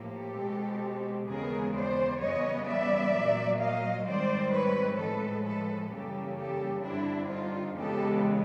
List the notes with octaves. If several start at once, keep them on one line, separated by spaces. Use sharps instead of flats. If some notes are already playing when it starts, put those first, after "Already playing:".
Already playing: A2 F3 A#3 G4 A4
B2 G#3 C4
D#2 C#3 E3 G#3 B3 G#4 A#4
C5 D5
F#2 C#3 E3 G3 B3 C#5 D#5
D5 E5
A#2 F#3 A#3
D#5 F5
G#2 D#3 G3 C4 C5 D5
B4 C#5
A2 F3 G#3 A4 B4
A4 B4
F#2 C#3 E3 G3 A#3 G4 A4
G4 A4
G2 D3 G3 C4 D4 E4
D#4 F4
E2 C#3 E3 G#3 B3 G4 A4